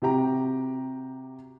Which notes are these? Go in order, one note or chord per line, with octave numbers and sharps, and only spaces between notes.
C3 F#4 G4 G5 A#5